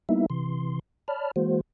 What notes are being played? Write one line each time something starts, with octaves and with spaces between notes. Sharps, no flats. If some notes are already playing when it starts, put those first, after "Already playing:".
G3 A#3 B3 D#4 E4 E5
C3 E3 C6
C#5 D5 A5 B5 F6
E3 G#3 A#3 F#4 C5